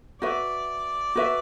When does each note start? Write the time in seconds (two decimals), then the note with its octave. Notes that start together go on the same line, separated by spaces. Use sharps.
0.22 F#4 B4 D5 E5
1.15 F#4 B4 E5